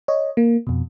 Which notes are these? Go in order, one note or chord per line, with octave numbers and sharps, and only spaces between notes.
C#5 D#5
A#3
F2 B2